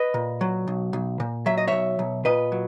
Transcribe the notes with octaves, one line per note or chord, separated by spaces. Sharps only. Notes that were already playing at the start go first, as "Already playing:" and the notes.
Already playing: B4 D#5
A#2
F#3
B1
B1
A#2
F#3 E5
D#5
B1 C#5 E5
B1
A#2 B4 D#5
F#3